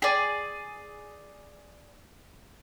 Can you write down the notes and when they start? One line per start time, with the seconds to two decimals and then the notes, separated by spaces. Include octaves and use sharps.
0.02 G#4 D5